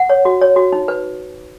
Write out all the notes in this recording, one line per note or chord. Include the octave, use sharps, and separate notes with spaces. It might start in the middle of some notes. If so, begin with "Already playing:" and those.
Already playing: F#5
C#5
F#4
C#5
F#4
D#4
B4